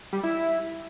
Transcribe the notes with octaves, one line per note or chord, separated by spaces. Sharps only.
G3
E4
E4